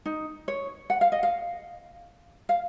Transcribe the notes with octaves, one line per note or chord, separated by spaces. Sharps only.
D#4
C#5
F#5
F5
D#5
F5
F5